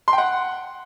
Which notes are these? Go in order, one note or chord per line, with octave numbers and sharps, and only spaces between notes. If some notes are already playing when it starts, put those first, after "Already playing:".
C6
G5
F#5